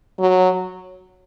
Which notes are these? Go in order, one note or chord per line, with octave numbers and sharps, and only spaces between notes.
F#3